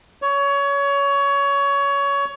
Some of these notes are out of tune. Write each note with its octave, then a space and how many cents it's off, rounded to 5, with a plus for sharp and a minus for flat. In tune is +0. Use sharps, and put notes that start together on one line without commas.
C#5 +20